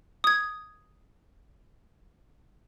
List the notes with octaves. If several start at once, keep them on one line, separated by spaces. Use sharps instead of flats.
D#6 G#6